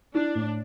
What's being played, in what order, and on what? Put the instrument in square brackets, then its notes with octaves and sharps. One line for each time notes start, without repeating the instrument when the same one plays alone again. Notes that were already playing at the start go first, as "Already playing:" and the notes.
[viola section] D4 [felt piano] E4
[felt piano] A2